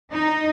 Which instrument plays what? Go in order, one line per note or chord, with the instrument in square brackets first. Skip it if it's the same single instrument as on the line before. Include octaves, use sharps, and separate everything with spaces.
[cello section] D#4